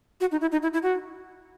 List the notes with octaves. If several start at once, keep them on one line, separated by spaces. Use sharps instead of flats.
F#4
D#4
E4
D#4
E4
E4
F#4